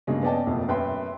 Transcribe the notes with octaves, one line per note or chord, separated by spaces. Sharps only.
G2 C#3 F#3 G#3 A#3 C#4
B3 C#4 D5 D#5 G5 A5
E1 F2 A3 A#3
F#2 B4 E5 G5 C6